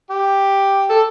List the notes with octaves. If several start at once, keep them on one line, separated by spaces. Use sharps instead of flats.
G4
A4